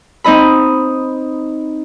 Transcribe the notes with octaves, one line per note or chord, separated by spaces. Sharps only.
C4 D#4 D#5 B5